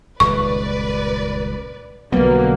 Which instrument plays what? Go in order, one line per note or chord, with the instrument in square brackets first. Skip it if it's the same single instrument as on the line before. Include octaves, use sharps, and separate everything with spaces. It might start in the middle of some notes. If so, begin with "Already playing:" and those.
[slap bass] D#1 C#2 [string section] B4 D5 [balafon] C#6
[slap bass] B1 G3 [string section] D3 A#3 [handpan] F#3 B3